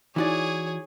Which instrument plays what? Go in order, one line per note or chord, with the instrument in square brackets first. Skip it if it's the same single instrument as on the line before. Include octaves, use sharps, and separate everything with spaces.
[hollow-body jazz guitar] E3 F#4 D5 [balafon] D#4 E4 G#5 [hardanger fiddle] G#4 C#5